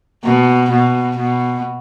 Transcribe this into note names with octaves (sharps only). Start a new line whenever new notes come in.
B2
B2
B2